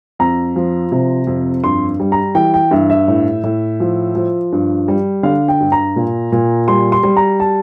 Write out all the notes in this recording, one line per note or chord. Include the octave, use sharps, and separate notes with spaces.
F2 A#5
F3
C3
F2
G2 C6
G3
A#5
E3 G5
G5
G2 E5
E5
A2
A2
F3
F3
G2
G3
D3 F5
G5
G2
A#5
A#2
A#2
G3 C6
C6
G3
A#5
A5